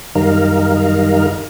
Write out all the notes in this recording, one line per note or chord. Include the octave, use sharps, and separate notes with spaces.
F#2 D#3 G3 D#4 A#4 F5